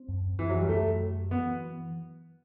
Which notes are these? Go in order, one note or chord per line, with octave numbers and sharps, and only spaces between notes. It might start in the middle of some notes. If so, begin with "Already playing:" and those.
Already playing: C4
F#2
F#2 E3
F#3
G3
F#2 A3
F#3
E3 B3